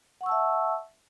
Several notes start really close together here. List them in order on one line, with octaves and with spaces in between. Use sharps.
F#5 C#6 E6 A5 E5